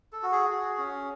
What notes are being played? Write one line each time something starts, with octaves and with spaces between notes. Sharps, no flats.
A4
F#4
G#4
F#4
C#4